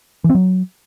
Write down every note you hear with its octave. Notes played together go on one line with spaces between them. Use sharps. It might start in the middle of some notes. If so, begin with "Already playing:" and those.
E3
C4
F#3